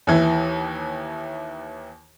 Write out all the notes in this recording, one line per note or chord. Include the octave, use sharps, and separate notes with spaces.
D#2 E3